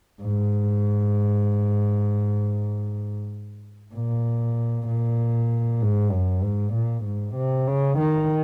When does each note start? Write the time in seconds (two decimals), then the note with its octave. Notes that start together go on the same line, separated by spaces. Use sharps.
0.22 G#2
3.95 A#2
4.88 A#2
5.81 G#2
6.12 F#2
6.43 G#2
6.74 A#2
7.05 G#2
7.36 C3
7.68 C#3
7.99 D#3